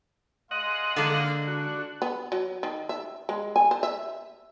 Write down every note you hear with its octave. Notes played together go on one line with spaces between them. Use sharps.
G#3 D#5 F5 F#5 C6
D3 G#3 A#3 A#4 F5
D4 F#4
B3
F#3
D#3
E5
G#3
G#5
C5
E5